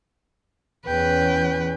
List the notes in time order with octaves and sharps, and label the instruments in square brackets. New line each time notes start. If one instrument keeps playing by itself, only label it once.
[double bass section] E2 C#4 [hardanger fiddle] B4 [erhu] G5